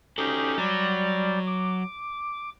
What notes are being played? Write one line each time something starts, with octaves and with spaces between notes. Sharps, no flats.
C#4 D#4 F#4 G4 A4
F#3 G3 D5
D6